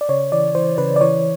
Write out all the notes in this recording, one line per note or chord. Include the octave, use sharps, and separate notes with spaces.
D5
C#3 C#5
E3 D5
E3 C5
C#3 B4
D5
E3 C#5